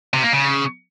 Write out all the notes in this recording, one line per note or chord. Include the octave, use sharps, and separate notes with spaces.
C3
A#3
C#3